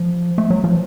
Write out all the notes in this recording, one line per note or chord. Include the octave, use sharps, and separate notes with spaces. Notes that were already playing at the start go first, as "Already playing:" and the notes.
Already playing: F3
A3
F#3
F3